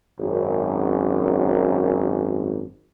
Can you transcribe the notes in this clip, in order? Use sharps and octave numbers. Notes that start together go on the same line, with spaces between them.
G#1 F#2